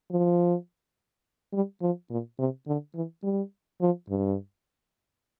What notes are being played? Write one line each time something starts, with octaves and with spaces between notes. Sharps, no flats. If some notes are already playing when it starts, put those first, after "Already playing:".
F3
G3
F3
A#2
C3
D3
E3
G3
F3
G2